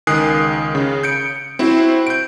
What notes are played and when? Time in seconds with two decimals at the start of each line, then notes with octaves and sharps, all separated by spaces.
0.07 C#2 D#3 G#5 D#6 F#6 C7
0.75 C#3
1.03 G6 C#7 D7
1.59 C4 E4 F#4 C5
2.07 G6 D7